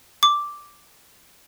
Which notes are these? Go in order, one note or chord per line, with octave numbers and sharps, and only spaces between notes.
D6